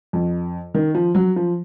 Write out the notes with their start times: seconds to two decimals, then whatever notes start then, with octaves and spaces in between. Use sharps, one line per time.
0.13 F2
0.74 D#3
0.95 F3
1.15 F#3
1.36 F3